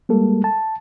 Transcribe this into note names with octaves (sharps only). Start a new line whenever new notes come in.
G3 G#3 A#3 A4
A5